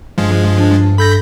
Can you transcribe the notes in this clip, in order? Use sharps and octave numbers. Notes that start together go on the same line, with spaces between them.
G2 F3 G#3
D4
A4 B5 G6 A#6